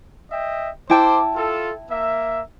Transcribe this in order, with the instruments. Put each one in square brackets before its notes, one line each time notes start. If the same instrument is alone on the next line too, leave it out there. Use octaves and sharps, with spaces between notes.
[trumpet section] D#5 E5 G5
[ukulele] E4 G5 A5 [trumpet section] C5 D6
[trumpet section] F4 A4
A#3 E5